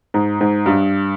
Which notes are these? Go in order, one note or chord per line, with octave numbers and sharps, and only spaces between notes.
G#2
G#2
G2